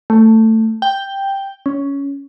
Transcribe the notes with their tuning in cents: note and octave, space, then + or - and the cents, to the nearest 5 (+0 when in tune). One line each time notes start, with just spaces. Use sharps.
A3 +15
G5 +0
C#4 +10